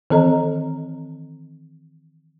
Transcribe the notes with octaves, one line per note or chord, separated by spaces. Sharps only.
D#3 E3 C4 A4 D#5 A#5